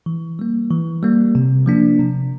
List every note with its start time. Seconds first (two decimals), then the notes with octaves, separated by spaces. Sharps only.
0.06 E3
0.39 G3 A#3
0.71 E3
1.03 G3 A#3
1.35 C3
1.66 F3 A#3 D4
1.99 C3